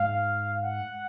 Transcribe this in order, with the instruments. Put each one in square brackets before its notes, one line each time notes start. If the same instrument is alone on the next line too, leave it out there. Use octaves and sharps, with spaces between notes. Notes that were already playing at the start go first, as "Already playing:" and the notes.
Already playing: [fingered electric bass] G#2 [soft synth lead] F5
[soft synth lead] F#5